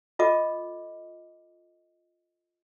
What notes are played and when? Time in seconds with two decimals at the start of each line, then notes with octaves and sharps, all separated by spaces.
0.19 F4 A4 D#5 D6